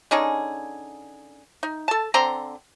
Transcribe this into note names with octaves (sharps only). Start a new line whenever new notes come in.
D3 C#4 D#4 G#4
D#4
A4 A5
D3 C4 A#5 C6